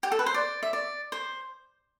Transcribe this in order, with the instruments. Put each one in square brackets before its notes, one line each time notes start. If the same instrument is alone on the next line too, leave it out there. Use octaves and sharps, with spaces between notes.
[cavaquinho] G4
A4
B4
C5
D5
E5
D5
C5